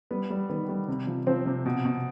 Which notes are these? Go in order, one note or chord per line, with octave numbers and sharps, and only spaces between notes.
G3 B3 B4
G3
D#3 B3 B4
G3
C3
F3
F3 C4 C5
C3
B2
B2